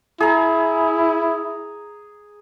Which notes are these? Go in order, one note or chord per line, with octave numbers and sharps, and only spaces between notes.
E4 G#4 A#5